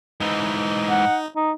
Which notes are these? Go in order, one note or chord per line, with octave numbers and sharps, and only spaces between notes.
G#2 E3 D#4
F#5
D#4